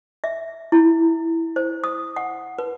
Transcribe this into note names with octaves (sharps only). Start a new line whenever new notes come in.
E5
E4
C5
D#6
F#5
B4